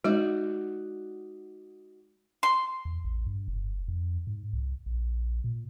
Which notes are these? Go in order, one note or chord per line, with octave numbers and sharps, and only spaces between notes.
G#3 D#4 F#4 D5
C6
E2
A1
G2
F#1
F2
G#2
C2
A#1
A#2